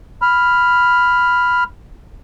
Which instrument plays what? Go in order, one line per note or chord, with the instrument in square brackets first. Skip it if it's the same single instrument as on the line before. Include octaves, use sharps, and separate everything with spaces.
[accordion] B5 F6